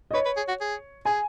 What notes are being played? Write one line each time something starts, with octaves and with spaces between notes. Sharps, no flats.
D#5
B4 C#5
B4
G#4
F#4
G#4
G#4 G#5